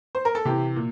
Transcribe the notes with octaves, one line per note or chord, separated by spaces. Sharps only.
C5
A#4
A4
C3 E3 G4
A#2